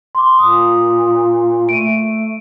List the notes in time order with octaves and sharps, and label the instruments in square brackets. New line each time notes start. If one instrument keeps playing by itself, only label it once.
[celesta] C6 D6
[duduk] A#2 [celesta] D#6
[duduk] A3 [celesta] D7 D#7